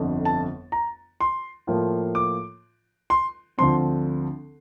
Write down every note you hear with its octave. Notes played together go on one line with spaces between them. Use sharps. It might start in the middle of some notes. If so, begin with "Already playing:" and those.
Already playing: G1 F2 D3
A5
A#5
C6
A2 F3 A#3 F4
D6
C6
D2 D3 F3 C4 C6